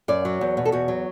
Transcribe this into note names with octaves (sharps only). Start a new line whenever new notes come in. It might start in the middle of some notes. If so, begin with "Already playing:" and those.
F#2 D5
F#3
E2
B2
A4
E2 F#4
F#3